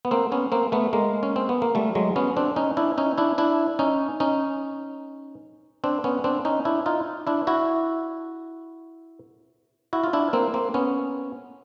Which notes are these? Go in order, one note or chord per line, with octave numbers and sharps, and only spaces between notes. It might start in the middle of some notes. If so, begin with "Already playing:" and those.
B3
A#3 C4
B3 C#4
A#3 C4
A3 B3
G#3 A#3
C#4
C4
B3
A#3
G3 A3
F#3 G#3
B3 C#4
C4 D4
C#4 D#4
D4 E4
C#4 D#4
D4 E4
D4 E4
C#4 D#4
C#4 D#4
C4 D4
B3 C#4
C4 D4
C#4 D#4
D4 E4
D#4 F4
D4 E4
E4 F#4
E4 F#4
F4
D4 E4
A#3 C4
A#3 C4
B3 C#4